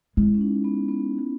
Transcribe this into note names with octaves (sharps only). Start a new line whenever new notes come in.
G#3 E4
C#4
D#4
B3
B3